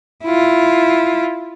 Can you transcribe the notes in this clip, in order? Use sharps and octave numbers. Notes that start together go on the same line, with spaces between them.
E4 F4